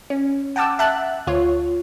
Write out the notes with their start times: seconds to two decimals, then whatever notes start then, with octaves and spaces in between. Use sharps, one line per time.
0.10 C#4
0.56 F#5 G5 A5 D6 E6
0.79 E5 F#5 A5 F#6
1.27 D2 F4 C#5